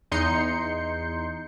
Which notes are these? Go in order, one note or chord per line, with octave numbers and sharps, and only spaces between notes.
E2 D#4 C6 G6 C#7